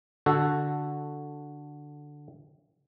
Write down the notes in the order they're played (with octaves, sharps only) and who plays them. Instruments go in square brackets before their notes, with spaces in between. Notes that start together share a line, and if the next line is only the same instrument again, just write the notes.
[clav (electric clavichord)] D3 F#4 A4